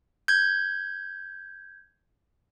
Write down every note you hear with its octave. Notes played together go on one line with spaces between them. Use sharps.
G6 G#6